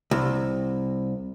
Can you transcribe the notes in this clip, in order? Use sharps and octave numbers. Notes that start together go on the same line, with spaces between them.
C2